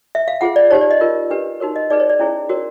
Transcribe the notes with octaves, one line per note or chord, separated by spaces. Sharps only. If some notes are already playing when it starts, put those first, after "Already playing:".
E5
F5
F4 G#4 C5 F#5
D5
D#4 G4 C5 C#5
D5
D#5
F4 A#4 C#5
D4 G4 B4
D#4 F#4 A#4 C#5
D#5
D#4 G#4 B4 D5
C#5
D5
C#4 E4 G#4 C#5
F#4 A#4 C#5